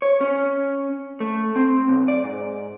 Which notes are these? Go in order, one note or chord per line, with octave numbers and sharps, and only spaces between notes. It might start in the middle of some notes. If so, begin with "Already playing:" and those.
C#5
C#4
A3
C4
B1
D5
G#2